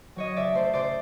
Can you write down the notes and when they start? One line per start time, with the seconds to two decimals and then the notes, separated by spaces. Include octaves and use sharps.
0.16 F#3 C#5 D#5
0.36 C#3 D5 E5
0.53 A3 C5 D5
0.73 C#3 C5 D5